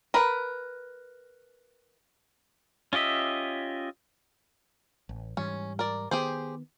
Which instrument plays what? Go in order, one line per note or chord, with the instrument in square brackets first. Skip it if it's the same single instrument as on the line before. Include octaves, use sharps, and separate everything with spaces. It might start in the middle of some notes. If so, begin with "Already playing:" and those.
[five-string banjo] A#4 B4
[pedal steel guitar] C#4 F4 G4 D#5 E5
[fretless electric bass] A1
[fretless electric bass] G#2 E3 G3 [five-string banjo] C#4
[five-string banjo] A#4 D5
[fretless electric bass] D#3 B3 [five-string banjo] G4 G#4 C5